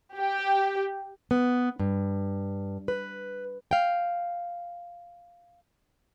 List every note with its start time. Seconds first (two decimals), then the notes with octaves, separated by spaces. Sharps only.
0.18 G4
1.31 B3
1.79 G2
2.88 B4
3.71 F5 G5